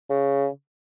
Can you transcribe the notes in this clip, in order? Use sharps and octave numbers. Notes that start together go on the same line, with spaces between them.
C#3